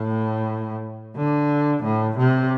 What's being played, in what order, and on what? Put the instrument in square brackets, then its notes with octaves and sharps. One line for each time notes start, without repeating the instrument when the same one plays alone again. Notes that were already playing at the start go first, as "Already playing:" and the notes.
Already playing: [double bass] A2
D3
A2
C3